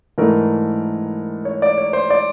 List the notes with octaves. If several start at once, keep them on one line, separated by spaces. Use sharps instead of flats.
G#2 E3 A3 D4 A#4
C#5
D5
C#5
C5
D5